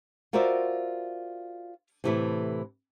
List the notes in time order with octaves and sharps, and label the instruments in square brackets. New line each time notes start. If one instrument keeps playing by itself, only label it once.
[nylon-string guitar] F4 F#4 A#4 C5 D5 E5
A2 C3 E3 G3 A3 E4